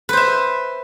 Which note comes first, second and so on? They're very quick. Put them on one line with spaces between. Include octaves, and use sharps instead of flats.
B4 C5 E5